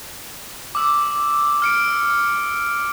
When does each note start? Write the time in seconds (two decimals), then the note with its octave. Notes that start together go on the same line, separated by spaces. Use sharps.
0.75 D6 E6
1.62 F6 C#7 D7